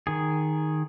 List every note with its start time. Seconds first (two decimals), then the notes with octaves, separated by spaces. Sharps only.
0.07 D#3 G#4